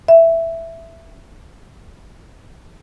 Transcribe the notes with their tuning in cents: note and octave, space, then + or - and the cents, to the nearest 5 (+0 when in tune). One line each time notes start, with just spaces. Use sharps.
E5 +5